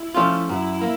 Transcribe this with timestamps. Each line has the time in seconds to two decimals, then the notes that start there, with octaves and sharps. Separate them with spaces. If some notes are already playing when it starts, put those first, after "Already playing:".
Already playing: E4
0.15 F3 A3 C#4 F4
0.49 F#2 E4
0.81 A#3